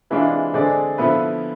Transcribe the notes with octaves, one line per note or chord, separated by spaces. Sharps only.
C3 E3 G#3 D4 F4
D3 G#3 C4 G#4 D5
D3 F3 B3 E4 B4